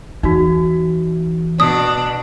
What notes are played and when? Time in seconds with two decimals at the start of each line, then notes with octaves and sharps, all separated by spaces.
0.23 E2 E3 D#4 F#4
1.60 B2 D4 D#6